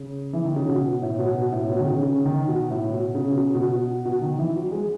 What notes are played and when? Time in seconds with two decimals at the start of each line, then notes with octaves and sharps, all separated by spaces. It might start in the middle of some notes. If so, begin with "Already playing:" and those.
Already playing: C#3
0.33 E3
0.45 D#3
0.56 C#3
0.68 B2
0.85 B2
1.02 A2
1.19 B2
1.36 B2
1.52 A2
1.69 B2
1.79 D#3
1.85 C#3
2.03 C#3
2.25 D#3
2.48 B2
2.70 A2
2.93 B2
3.15 C#3
3.30 B2
3.37 C#3
3.55 B2
3.72 B2
4.05 B2
4.22 D#3
4.39 E3
4.56 F#3
4.72 G#3